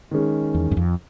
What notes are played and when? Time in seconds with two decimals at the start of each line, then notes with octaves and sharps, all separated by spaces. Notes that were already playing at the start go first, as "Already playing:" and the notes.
0.11 D#3 G#3 C#4
0.54 E2
0.71 F#2
0.77 F2